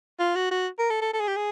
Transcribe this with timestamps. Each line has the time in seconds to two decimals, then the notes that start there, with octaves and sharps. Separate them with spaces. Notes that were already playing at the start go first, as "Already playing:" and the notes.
0.19 F4
0.35 F#4
0.51 F#4
0.79 A#4
0.90 A4
1.01 A4
1.13 A4
1.20 G#4
1.28 G4
1.36 G#4